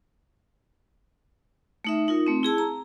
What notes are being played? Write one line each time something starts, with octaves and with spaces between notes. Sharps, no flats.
A3 D#4 E5
D#4 F4 A#4
A3 C4
E4 G#4 A5 E6
A#5